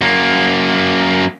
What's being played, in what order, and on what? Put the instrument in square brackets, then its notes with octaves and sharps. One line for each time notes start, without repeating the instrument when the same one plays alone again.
[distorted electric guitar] F#2 A#3